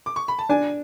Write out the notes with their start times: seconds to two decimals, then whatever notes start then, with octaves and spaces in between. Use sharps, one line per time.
0.06 D6
0.16 C#6
0.28 B5
0.39 A5
0.49 D4 G#5